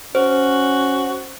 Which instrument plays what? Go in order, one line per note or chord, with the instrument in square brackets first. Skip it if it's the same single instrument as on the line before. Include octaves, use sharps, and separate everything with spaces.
[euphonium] C#4 [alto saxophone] F#4 [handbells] C5